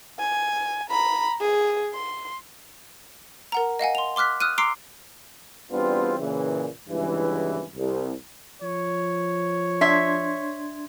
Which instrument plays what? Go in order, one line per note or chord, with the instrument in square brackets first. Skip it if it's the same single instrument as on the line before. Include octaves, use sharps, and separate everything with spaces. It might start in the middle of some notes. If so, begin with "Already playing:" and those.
[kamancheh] G#5
A#5 B5
G#4
C6
[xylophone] A#4 F#5 A#5
D#5 F5 F#5 G#5
C6 F7
C6 D6 F6 F#6 B6
D#6 F6 F#6 D#7
A#5 C6 D6 E6 C7 D7
[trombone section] E2 G3 B3 C4 D4 F4
A#2 C#3 E3
G#1 C#2 G2 E3
C2
[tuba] F3 [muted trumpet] C#5
[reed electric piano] D4 C6 G#6 [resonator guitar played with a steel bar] E5